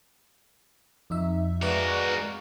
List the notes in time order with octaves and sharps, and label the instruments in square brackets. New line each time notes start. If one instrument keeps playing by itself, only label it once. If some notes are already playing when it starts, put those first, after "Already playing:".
[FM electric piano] F2 D#4 E5
[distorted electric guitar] G#3 A#4 [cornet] F#4 [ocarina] B4 [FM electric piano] D5 F5